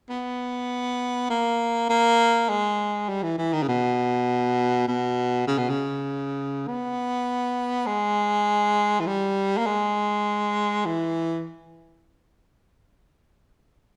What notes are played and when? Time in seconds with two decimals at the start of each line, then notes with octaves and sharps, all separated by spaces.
0.10 B3
1.30 A#3
1.89 A#3
2.49 G#3
3.09 G3
3.23 E3
3.38 E3
3.53 D#3
3.62 C#3
3.68 B2
4.88 B2
5.47 C#3
5.58 B2
5.69 C#3
6.68 B3
7.86 G#3
9.00 E3
9.07 G3
9.57 A#3
9.66 G#3
10.85 E3